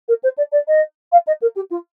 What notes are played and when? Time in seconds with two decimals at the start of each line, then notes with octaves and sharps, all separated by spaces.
0.08 A#4
0.23 C5
0.37 D5
0.52 D5
0.67 D#5
1.12 F5
1.27 D#5
1.41 A#4
1.56 G4
1.70 F4